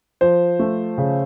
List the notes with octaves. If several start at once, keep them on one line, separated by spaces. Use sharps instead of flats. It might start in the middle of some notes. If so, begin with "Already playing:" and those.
F3 C5
A3
C#3